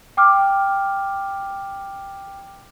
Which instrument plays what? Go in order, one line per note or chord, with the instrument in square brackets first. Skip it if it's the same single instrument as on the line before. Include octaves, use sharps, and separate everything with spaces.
[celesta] G5 D6 F6